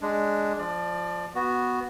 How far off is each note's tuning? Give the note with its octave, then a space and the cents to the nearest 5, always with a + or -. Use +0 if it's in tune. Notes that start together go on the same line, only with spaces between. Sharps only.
G#3 +0 D4 +0
F3 +0 D5 +25
B3 +0 F#4 +0